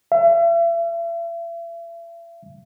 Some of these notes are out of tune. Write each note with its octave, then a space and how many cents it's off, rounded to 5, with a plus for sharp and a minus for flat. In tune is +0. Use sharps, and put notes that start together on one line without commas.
E5 +40